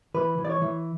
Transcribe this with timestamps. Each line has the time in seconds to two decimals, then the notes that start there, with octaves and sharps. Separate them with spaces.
0.14 E3 B4
0.38 E3
0.45 D5
0.49 C#5
0.62 E3